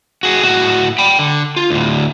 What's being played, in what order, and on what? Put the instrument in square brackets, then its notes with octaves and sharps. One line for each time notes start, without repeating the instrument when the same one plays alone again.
[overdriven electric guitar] F#4 G#4
A2 F#4
G5 B5
D3
F4
D2 A2